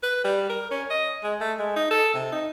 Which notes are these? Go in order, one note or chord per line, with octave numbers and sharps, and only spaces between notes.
B4
G3
A#4
C#4
D#5
G#3
A3
G#3
D#4
A4
C3
D#4